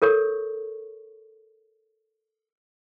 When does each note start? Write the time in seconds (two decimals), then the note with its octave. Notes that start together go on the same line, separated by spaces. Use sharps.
0.02 A4 A#4 C#5 C#6